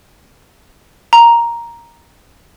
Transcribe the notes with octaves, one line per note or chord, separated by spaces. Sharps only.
A#5